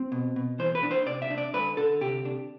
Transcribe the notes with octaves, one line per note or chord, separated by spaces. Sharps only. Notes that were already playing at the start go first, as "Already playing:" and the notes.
Already playing: C4
B2
B2
E3 C5
B4
D4
C5
C3 D5
E5
D4
D5
D3 B4
D3 A4
C3 G4
D4